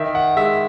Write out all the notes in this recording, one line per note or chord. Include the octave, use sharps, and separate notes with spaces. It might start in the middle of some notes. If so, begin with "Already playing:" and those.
Already playing: D#3 E5
F#5
G#3 E5